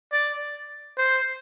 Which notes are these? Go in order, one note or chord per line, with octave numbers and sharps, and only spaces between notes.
D5
C5